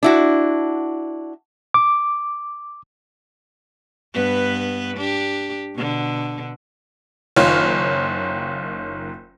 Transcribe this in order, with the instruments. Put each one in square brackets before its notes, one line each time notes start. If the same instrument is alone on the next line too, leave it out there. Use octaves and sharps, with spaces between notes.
[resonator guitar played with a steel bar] D4 E4 F#4
[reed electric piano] D6
[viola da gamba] G2 B3 B4
D4 G4
B2 D3
[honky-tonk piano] F#1 D#3 F4 C#5 F6